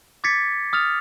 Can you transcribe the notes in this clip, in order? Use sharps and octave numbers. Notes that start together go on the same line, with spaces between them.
D6 G#6 A6 B6 C#7
D#6 F6 A6 F7